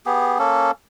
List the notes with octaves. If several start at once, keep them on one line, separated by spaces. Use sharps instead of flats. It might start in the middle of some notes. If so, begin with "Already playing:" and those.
B3 G4 G#4
A#3 C#4 A4